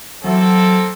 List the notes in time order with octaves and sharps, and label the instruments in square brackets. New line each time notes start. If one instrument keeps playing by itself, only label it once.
[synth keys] E3 F#3 [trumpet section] A#3 C4 A4